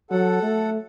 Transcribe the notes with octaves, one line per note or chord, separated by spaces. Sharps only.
F#3 A4 F#5
A3